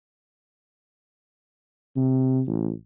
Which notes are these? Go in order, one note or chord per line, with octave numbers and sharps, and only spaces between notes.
C3
A1